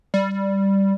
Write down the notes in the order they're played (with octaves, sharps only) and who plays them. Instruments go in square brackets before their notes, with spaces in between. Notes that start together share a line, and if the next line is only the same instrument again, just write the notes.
[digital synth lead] G3